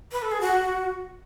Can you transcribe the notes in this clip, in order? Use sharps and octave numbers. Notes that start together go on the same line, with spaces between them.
B4
A4
G#4
F#4